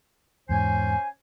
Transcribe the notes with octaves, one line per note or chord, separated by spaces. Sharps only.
E2 G#2 C#4 C5 G#5